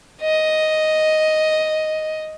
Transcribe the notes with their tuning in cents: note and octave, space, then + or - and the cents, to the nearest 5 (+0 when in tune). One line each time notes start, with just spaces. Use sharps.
D#5 +5